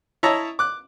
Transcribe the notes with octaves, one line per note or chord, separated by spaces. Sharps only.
E4 C#5 D#5 E5 A5 A#5
D6 F#6